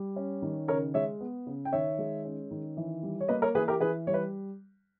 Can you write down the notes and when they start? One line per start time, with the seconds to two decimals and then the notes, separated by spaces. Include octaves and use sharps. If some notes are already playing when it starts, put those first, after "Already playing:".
Already playing: G3
0.16 C#4
0.42 D#3
0.68 C#3 A#4 C#5
0.94 G#3 C#5 E5
1.21 B3
1.47 C#3
1.65 G5
1.72 D#3 C#5 E5
1.99 G#3
2.24 C#4
2.51 D#3
2.77 E3
3.03 G3
3.21 C#5
3.28 A#3 B4 D#5
3.42 A#4 C#5
3.55 E3 G#4 B4
3.68 G4 A#4
3.80 E3 G#4 B4
4.07 G3 C#5
4.14 B4